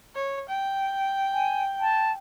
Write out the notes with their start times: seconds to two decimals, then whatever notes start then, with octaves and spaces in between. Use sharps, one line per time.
0.15 C#5
0.49 G5
1.33 G#5
1.80 A5